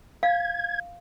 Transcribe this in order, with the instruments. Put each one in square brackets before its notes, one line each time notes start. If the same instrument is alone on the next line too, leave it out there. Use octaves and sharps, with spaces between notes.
[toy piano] F5 [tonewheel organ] G#6